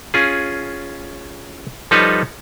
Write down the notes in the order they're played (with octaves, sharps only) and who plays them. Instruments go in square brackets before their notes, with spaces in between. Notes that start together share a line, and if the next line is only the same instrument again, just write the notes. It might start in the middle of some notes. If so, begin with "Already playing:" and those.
[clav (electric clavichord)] C#4 F4 G#4
F3 G3 D#4 A4 B4 C#5